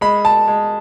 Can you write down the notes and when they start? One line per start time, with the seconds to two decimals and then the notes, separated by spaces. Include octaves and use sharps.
0.01 G#3 B5
0.25 A5
0.48 G#3